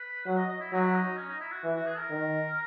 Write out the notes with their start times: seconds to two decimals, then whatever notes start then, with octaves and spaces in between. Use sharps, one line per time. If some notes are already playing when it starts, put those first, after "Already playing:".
Already playing: B4
0.26 F#3 F#5
0.37 D#5
0.49 D#5
0.60 E4
0.72 F#3 D#4
0.83 E4
0.94 D#4
1.17 C#4
1.29 D#4
1.40 E4
1.52 F#4
1.64 E3
1.75 F#4
1.86 G#4
1.98 A#4
2.10 D#3